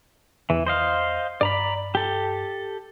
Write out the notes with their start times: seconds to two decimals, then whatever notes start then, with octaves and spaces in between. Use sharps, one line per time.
0.50 E2 E3
0.67 C5 D#5 F5
1.41 G2 D5 A#5 B5
1.95 G4 A4